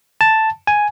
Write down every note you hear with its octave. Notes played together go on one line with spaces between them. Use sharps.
A5
G#5